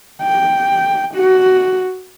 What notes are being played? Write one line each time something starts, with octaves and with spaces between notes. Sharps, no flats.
G5
F#4